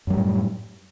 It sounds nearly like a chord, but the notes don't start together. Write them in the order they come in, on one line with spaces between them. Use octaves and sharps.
F#2 F#3 G3 A2